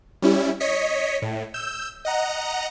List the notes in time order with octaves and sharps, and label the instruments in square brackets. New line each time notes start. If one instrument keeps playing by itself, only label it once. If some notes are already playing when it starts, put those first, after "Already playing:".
[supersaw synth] G3 C#4 E4
C#5 D#5 B6 C#7
A2
E6 G6
D#5 F#5 A#5